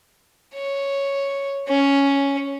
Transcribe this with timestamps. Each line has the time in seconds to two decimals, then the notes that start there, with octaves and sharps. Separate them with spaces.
0.54 C#5
1.68 C#4